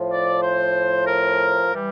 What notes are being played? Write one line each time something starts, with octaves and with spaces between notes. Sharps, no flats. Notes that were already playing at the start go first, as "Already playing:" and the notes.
Already playing: A2 F3
D5
C5
A#4
E3 G3